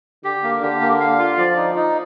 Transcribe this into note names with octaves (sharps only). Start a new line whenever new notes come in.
D3 G4
A#3
D3 G4
A#3
F5
F4
F3 D5
D#4
D#4